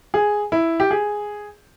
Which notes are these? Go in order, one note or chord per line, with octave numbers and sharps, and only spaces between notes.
G#4
E4
G4
G#4